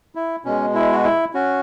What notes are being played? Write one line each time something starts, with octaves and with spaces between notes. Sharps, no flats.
E4
B2 G#3 C#4
E4
F#4
E4
C#4 F#4